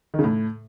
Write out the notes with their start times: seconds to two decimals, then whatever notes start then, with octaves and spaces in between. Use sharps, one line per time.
0.14 D#3
0.19 C#3
0.24 A2